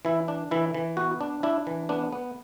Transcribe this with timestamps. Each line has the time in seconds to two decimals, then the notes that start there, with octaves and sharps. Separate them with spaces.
0.05 E3 E4
0.28 D4
0.51 E3 E4
0.74 E3
0.97 B3 F#4
1.21 D4
1.43 D4 E4
1.67 E3
1.89 B3 D4
2.12 B3